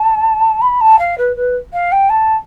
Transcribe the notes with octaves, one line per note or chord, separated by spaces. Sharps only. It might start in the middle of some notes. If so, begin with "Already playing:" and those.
Already playing: A5
B5
A5
F5
B4
B4
F5
G5
A5